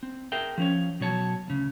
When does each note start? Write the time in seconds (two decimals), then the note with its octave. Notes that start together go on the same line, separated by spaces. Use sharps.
0.03 C4
0.32 G#4 A#4 E5 G5
0.58 F3 C#4 C#5
1.00 B2 F#3 C#5 A5
1.48 D2 C#3